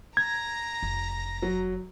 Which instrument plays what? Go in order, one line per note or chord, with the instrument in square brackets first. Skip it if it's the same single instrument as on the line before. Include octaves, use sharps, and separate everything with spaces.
[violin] A#5 A#6 [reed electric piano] G#6
[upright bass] F1
[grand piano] F#3